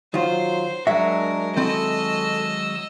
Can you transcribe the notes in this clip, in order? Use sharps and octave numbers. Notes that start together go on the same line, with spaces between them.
D#3 F#3 F4 C5
F#3 G#3 D4 F#4 A#4 E5
D#3 C4 E4 A4 D#5 E6